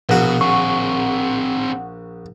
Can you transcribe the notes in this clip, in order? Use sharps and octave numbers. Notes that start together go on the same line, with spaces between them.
A#1 B2 F#4 F#5
C4 G#4 C#6